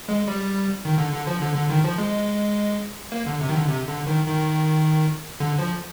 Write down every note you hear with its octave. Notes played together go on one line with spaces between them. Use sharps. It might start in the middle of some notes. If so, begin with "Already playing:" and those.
G#3
G3
D#3
D3
D3
F3
D3
D3
D#3
F3
G#3
A#3
D3
C3
D#3
D3
C3
D3
D#3
D#3
D3
F3